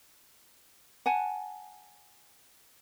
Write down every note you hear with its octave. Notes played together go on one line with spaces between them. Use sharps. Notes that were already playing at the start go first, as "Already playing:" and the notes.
F#5 G#5 A5